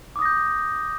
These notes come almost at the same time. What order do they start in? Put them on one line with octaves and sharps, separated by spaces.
D6 D#6 A#6 G6